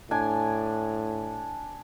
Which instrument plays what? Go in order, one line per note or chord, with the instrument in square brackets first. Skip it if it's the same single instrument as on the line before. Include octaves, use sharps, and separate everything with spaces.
[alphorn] A2 [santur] D4 G#5